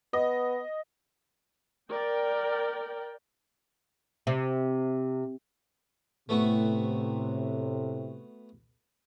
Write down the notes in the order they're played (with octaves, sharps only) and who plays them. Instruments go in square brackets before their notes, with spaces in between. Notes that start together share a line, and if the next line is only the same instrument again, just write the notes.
[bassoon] B3 [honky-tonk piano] D#5
[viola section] A#4 D5 G5
[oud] C3
[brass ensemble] A2 C3 [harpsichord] A3 B3 F#4